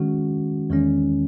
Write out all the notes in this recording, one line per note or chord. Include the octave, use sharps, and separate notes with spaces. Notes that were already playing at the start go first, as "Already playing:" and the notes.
Already playing: D#3 G#3 C#4 F#4
E2 D#3 G#3 C#4